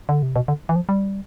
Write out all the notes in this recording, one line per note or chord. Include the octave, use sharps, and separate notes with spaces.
D3
C3
B2
D3
E3
F3
G3